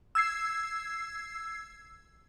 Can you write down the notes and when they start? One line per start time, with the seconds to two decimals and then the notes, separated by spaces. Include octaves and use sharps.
0.15 E6 G#6 C7